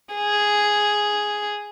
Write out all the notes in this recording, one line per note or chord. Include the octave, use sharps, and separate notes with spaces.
G#4